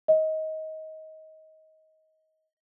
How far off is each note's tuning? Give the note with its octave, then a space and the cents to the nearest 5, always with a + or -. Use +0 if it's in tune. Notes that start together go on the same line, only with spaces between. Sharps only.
D#5 +20